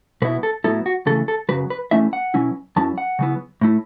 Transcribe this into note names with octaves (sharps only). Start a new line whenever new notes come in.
B2 F#3 B3 E4 B4
A4
A2 F#3 B3 E4 A4
F#4
C#3 E3 A3 A4
A4
F#2 C#3 F#3 B4
B4
E2 B2 A3 C#4 E4 E5
F#5
B2 F#3 C#4 E4
F#2 F#3 C#4 E4 A5
F#5
C#3 F#3 B3 E4
A2 A3 E4